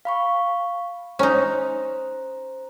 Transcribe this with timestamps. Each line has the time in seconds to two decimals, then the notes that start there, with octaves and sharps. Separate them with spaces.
0.05 F5 B5 C#6
1.19 C#4 D#4 C5 A#5